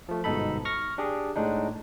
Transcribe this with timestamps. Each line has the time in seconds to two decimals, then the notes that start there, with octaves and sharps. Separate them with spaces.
0.09 F3 A3
0.24 G1 G#2 B2 D#4 A4 B5
0.65 C#6 F6 A#6
0.98 D4 G4 G#4
1.36 A2 G#3 D4 D#4